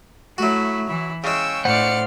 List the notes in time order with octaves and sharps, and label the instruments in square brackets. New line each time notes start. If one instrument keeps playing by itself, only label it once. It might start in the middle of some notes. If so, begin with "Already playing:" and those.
[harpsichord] F#3 F#4 [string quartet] A3 E4
[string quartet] E3 E4
[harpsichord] C#3 G#3 [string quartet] G5 C#6 [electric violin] E6
[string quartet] A2 C6 F6 [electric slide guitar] C5 F#5 [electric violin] D5 C#7